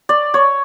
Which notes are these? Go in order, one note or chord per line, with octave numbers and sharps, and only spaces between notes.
D5
C#5